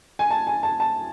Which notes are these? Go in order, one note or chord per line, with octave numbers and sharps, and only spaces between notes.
G#5
A5
G#5
A5
A5